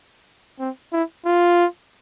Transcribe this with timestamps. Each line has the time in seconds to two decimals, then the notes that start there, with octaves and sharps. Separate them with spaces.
0.59 C4
0.92 E4
1.26 F4